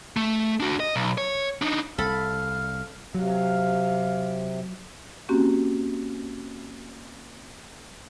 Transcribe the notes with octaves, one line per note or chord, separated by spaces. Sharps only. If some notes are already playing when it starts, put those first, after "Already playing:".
A3
D4 F#4
D#5
B1
C#5
D4 D#4
C2 A4 F5 B5
C3 F#3 F5
A#3 C4 C#4 F#4 G4